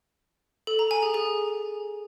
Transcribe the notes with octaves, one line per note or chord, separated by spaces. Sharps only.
A4
A#5
G#5
G#4
G#4